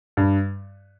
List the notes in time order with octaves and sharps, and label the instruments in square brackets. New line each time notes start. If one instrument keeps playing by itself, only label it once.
[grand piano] G2